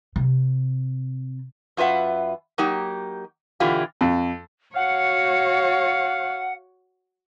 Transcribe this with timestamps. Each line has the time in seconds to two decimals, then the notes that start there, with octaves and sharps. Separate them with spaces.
0.16 C3
1.77 F#2 F4 B4 E5 F#5
2.58 F#3 A#3 D#4 G4
3.60 B2 D3 E3 E4 F4 G4
4.01 F2
4.76 F#4 C#5 F5 F#5